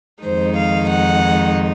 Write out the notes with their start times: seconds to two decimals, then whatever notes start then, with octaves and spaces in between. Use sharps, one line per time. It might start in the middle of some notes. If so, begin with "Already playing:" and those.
0.23 F2 D#3 G#3 D#4 C5
0.56 F5
0.89 F#5